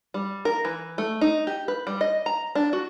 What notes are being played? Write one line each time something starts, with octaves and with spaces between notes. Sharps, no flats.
G3
A#4
E3
A3
D#4
G4
B4
G3
D#5
A#5
D4
F#4